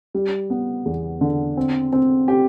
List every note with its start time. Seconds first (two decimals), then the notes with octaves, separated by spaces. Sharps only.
0.14 G3
0.50 B3
0.86 E2
1.21 D3
1.57 C4
1.93 C4
2.28 G4